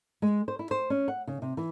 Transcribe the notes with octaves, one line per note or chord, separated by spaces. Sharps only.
G#3
C5
E4
C5
C#4
F#5
C#3
C3
E3